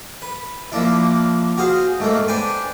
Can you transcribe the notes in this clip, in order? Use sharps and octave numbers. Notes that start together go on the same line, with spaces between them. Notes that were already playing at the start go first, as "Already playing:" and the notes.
B4
F3 A#3 D4 E4
F#4 G#4 C5 F5
G#2 A3 A#3
D4 B4 C5 G5 G#5